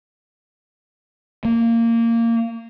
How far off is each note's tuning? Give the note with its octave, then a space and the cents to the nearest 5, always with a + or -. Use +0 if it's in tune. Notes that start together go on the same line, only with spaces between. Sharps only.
A#3 -15